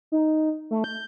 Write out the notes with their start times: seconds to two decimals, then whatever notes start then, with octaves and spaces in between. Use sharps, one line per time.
0.12 D#4
0.71 A3
0.84 G6